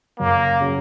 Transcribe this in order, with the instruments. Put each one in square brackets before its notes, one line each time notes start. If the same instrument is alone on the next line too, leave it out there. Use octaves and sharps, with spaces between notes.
[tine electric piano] F#2 C#3 F#3 [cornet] A#3
[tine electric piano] C#3 F#3